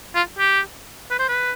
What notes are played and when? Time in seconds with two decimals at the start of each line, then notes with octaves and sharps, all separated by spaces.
0.15 F4
0.39 G4
1.11 B4
1.19 C5
1.28 B4